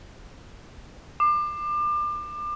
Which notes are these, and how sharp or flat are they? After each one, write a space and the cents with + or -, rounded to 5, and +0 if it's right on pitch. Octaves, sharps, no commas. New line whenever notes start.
D6 +30